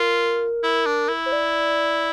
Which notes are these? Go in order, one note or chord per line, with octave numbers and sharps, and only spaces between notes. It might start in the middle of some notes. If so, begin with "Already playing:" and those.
Already playing: F4 A#4
E4
D4
E4
C5
D5